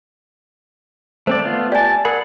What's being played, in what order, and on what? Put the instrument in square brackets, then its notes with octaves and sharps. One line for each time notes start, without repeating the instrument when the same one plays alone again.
[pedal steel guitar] A3 C4 D5 [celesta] C5
[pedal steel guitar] A3 B3 F4
[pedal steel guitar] G4 A5 [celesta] D5 G#5
[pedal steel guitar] G#4 F#5 B5 [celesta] A#4